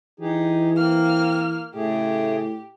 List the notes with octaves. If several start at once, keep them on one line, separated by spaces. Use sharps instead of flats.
E3 D#4 G4 G#4
A#3 C4 F6
A2 C#3 A3 G4 G#4